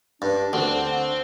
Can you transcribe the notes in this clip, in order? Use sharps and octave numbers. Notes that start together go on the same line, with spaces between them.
G2 D4
D2 C4 F#5